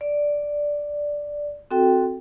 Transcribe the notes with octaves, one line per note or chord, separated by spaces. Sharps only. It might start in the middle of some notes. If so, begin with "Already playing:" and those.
D5
C4 F#4 A4 G5